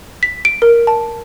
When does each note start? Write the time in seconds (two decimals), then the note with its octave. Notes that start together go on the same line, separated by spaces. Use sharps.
0.23 B6
0.45 D7
0.62 A#4
0.87 A5